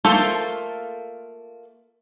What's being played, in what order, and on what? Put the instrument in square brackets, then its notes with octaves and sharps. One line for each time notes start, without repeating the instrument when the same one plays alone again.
[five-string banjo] A3 A#3 F4 A4 C5